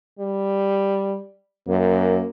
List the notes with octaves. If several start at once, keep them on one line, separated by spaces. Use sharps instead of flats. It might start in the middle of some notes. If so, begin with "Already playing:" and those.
G3
F#2 A#3